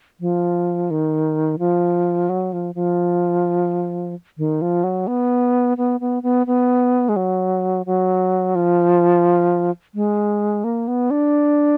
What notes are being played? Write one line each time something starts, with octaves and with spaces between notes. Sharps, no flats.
F3
D#3
F3
F#3
F3
F3
D#3
F3
F#3
B3
B3
B3
B3
B3
G#3
F#3
F#3
F3
G#3
A#3
B3
D4